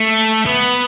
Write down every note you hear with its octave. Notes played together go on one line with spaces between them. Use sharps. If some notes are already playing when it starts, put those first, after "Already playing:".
Already playing: A3
B3